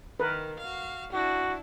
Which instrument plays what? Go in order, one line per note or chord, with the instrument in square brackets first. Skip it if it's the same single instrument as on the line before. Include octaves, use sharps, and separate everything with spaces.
[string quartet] D#3 [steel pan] A#4 B4
[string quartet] F#4 F5
[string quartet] D4 E4 [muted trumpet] F#4